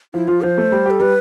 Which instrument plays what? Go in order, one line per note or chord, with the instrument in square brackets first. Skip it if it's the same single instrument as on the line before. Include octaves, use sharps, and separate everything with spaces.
[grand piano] F3 [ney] E4
[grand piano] F3 [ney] F4
[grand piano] F3 [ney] C5
[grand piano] A3
G3
[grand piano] G4 [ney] A4
[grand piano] G3 [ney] B4